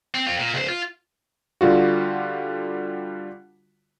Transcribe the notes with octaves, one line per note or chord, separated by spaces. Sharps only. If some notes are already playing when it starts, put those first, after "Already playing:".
C4
C4 F4
A#2
C#2 C5
F4
D3 G3 F4 F#4